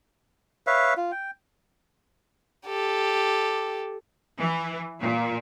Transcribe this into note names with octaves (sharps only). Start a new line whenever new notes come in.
B4 C#5 E5 F5
F4
G5
G4 A4
E3
A#2